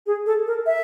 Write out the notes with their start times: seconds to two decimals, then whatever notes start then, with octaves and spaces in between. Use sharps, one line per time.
0.06 G#4
0.26 A4
0.47 A#4
0.66 E5